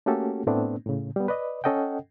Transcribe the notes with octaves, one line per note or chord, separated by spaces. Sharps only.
A3 A#3 C#4 F#4 G4 A4
A2 A3 B3 C4 D4
A2 C#3
G3 B3
B4 D5 D#5
C#4 A4 D#5 F#5 G5